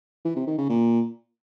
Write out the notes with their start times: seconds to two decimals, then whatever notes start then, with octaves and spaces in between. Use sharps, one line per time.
0.25 E3
0.36 C3
0.47 D#3
0.58 C#3
0.69 A#2